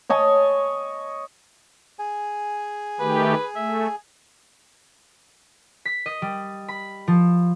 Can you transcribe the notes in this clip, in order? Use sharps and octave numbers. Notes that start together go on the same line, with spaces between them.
C#5 D#5 G#5 A5
G#4 G#5
D#3 A3 G4 B4
A3 E5
B6
D#5
G3
B5
F3